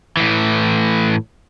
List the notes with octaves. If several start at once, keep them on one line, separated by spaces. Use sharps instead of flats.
A2 E3